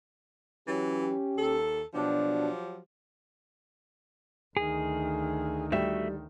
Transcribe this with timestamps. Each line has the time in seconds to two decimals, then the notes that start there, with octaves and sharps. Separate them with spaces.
0.68 E3 F#3 C#4 G4
1.36 D#2 A4
1.94 B2 F3 F#3 D4 G4
4.57 D2 D#3 G#4
5.72 G3 A3 F#4 E5